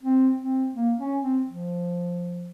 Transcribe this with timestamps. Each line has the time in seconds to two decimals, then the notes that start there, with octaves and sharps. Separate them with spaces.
0.03 C4
0.39 C4
0.74 A#3
0.98 C#4
1.22 C4
1.47 F3